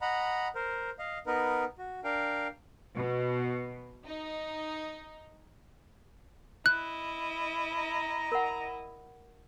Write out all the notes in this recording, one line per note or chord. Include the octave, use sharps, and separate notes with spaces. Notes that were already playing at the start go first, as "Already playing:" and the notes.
D#5 F#5 A#5 B5
A#4 C5
D#5 F5
B3 D#4 A#4 B4
F#4
D4 A#4 F5 G5
B2
D#4
E4 D#5 F#6
A#5
A#4 F#5